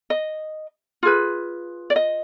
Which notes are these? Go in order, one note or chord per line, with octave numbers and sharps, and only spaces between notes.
D#5
F4 G#4 B4
D5
D#5